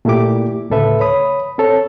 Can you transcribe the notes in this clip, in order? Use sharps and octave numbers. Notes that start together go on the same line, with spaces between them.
A#2 A3 A#3 E4 G4 D6
D2 A2 C#3 A4 B4 E5
C#5 B5 D#6
C4 A4 C#5